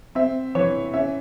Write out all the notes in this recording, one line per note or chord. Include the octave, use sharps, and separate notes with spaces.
C4 E5
E3 C#5
C#4 E5